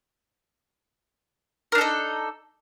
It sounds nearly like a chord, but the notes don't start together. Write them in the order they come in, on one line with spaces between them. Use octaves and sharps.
A#4 D4 A4 D#4